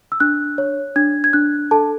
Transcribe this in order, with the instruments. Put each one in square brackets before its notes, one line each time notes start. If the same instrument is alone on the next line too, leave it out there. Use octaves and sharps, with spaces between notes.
[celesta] E6
D4 F#6
C#5
D4 G#6
G#6
D4 F#6
A4 A5